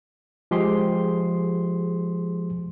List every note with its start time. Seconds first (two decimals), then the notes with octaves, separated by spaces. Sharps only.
0.51 F3 G#3 G4 G#4 C6